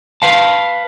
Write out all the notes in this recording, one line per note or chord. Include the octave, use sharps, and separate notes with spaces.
B4 F5 A5